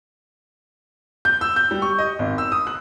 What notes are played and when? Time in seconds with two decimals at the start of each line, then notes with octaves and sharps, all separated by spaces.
1.25 G6
1.41 E6
1.56 G6
1.71 G3
1.82 C#6
1.98 D#5
2.19 G#1
2.38 E6
2.52 D#6
2.67 F#6